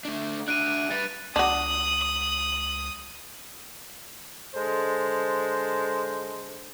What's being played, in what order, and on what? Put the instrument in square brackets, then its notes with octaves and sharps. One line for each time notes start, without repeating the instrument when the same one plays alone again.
[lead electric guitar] A3 D4
[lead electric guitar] D4 F#4 [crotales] F#6 D7 D#7
[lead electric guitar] G3 B4 [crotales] A6
[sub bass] C#2 [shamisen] D4 F#4 [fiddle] D#6 [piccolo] F#7
[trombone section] D3 G#3 A4 C5